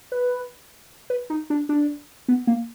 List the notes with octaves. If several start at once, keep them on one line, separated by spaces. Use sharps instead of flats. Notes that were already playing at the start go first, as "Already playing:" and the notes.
B4
B4
D#4
D4
D4
B3
A#3